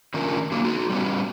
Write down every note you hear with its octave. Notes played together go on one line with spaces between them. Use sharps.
D3 D#3 F3 A3 C#4 A#4
D3 F#3 A#3
D#4 F#4
G3 B3 C#4